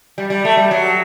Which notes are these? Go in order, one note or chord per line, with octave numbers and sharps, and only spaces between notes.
G3
G3
A3
G3
F#3